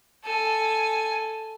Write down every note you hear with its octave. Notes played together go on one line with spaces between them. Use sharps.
A4 G#5